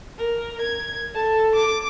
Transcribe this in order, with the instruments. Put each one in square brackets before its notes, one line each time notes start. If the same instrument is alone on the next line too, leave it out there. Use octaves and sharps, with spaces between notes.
[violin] A#4
G#6
[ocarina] A4 [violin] A5
[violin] D6